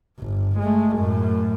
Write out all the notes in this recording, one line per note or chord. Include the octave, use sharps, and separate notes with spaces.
G1
G#3 A3
F#2 A2